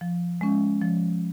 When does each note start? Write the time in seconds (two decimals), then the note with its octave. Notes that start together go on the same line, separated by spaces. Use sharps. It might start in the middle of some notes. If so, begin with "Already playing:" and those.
0.01 F3
0.41 G#3 C#4
0.81 F3